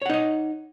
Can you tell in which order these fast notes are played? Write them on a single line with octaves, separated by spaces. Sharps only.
C#5 F#5 D#4 D#5